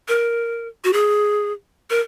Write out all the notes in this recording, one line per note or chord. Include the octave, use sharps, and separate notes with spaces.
A#4
F#4
G#4
A#4